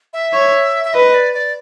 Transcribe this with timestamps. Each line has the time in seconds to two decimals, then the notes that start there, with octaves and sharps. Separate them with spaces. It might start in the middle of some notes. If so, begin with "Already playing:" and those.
0.13 E5
0.34 C#5
0.85 E5
0.93 B4 D#5
1.14 D5
1.34 D5